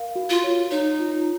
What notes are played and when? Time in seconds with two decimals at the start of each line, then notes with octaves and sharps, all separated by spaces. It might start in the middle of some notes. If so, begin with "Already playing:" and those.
Already playing: A#4 F5
0.16 F#4
0.30 F4
0.44 C#5
0.71 D#4 C#5
0.99 F4